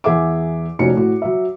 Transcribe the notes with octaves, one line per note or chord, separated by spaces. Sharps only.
E2 G#4 E5 F#5 D6
F1 F3 C#4 D#4 F#4 C#7
A2 F#4
F#3 E5